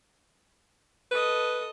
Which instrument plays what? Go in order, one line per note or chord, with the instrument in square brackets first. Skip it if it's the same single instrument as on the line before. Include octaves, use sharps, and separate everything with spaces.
[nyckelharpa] A4 D#5 [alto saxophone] B4